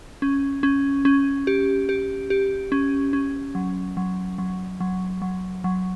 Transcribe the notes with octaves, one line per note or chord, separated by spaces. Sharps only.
C#4
C#4
C#4
G4
G4
G4
C#4
C#4
F#3
F#3
F#3
F#3
F#3
F#3